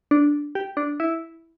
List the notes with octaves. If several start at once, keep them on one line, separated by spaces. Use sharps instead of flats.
D4
G4
D4
E4